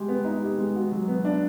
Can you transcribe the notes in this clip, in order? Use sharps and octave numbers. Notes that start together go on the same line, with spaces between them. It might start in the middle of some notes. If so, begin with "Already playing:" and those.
Already playing: G#3 G4
B3
D#4
G4
G#3
F#4
F#3
B3
D4